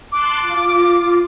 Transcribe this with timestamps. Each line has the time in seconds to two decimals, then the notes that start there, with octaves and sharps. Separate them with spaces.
0.12 A5 C6 D6 F#6
0.41 F4